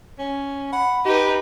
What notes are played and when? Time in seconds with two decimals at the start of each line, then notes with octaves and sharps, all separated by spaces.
0.18 C#4
0.72 F#5 B5
1.05 D#4 G4 B4